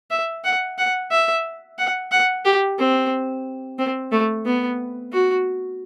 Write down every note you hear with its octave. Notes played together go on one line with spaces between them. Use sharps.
E5
F#5
F#5
E5
F#5
F#5
G4
C4
C4
A3
B3
F#4